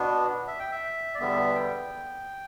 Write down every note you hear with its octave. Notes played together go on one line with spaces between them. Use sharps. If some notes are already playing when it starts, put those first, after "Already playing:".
Already playing: B2 B3 D4
E5
G5
E5
D5
E2 D3 G3 B3 E5
G5